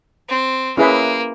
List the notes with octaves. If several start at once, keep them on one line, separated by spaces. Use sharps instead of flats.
C4
A#3 C#4 E4 G#4 B4 E5